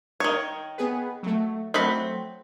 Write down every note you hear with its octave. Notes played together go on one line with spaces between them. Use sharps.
D#3 C#5
B3 G#4 B4
F#3 A3
F#3 A3 C4 F#5 B5